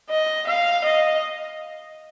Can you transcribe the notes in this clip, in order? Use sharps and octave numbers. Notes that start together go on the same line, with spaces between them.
D#5
F5
D#5